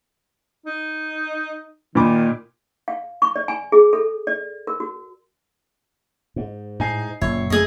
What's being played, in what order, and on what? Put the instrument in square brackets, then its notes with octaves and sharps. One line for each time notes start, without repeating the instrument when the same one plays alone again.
[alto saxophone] D#4
[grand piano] A#2 B5 D6 [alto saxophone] D#3
[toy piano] F5
C#6
D5
G#5
G#4
A4
D5
A#4
F#4
[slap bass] G#2
[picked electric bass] A2 [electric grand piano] D#4 G#5 C7
[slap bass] F#1 [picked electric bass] A#2 [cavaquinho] C#5 [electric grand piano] E5
[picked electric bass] F#2 A3 [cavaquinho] G#4 D#5